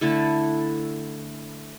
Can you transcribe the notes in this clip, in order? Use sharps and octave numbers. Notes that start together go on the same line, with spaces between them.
D3 A3 E4 A4